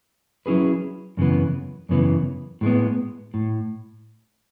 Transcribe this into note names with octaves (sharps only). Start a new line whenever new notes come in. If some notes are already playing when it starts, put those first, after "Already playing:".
F#3 C#4 E4 G#4 B4
F#2 C#3 E3 B3
F#2 C#3 E3 B3
A2 G#3 B3
A2